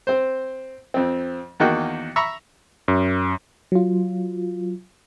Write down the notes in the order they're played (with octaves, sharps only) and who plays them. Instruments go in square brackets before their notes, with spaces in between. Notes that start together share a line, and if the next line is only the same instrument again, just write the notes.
[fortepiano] C4 C5
F2 C4
E2 D#3 A#3 D#4 F#4 G5
E5 A#5 B5 C#6 E6
[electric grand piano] F#2
[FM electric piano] F#3 F4